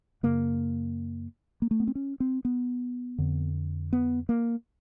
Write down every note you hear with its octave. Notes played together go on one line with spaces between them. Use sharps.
F#2 C#3 A#3
A#3
A3
B3
C4
C#4
C4
B3
F2 D3
B3
A#3